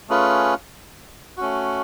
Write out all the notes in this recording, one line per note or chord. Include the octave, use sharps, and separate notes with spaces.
A3 C#4 F4 G#4 B4
A3 C#4 F#4